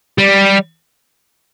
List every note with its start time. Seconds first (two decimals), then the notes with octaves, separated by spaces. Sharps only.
0.18 G3